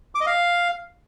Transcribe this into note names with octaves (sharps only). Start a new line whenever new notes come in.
D6
D#5
F5